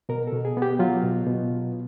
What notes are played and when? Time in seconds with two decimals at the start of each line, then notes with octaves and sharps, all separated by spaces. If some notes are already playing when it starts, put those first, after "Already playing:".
0.09 B2 A#4
0.27 A4
0.33 B2
0.45 G#4
0.57 B3
0.62 G4
0.79 F#3 F4
1.03 B2
1.27 B2